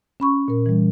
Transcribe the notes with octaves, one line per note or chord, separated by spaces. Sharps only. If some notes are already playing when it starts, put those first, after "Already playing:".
C#4 B5 C#6
A#2 A#4
E3 G3